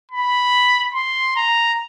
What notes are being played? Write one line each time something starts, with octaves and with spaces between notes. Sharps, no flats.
B5
C6
A#5